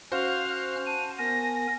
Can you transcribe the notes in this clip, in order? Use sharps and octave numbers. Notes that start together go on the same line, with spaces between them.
C#4 F#4 C5 F5 F6 F#6
A5 D#7
B3 A#4 G#5 A#6